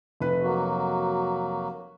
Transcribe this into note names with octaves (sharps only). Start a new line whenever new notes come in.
F1 B4
F#3 A#3 F#4